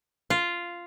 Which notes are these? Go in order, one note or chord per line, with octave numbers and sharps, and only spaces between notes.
F4